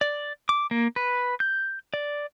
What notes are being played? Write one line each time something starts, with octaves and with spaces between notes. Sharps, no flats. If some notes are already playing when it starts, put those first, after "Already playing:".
D5
D6
A#3
B4
G6
D5